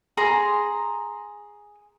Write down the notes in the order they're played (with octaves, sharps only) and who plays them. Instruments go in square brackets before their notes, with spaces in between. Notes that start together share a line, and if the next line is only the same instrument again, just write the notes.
[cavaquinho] G#4 A#5 C6